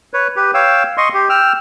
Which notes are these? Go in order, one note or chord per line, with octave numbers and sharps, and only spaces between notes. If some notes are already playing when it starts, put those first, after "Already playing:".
B4 C#5
G4 B4
C#5 F5 G5 E6
D#5 C6 C#6
G4
G5 E6 F6